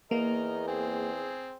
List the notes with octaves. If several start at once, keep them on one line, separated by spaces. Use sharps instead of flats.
E2 A#3 A#4 D#5
C4 G#4